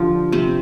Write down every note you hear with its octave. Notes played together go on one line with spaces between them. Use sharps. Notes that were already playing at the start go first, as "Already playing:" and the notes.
Already playing: D3 F3 D4 F4 G4
C3 C4